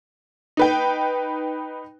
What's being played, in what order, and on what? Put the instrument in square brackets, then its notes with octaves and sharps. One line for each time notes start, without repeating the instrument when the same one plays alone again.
[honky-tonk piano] D#4 B4 G5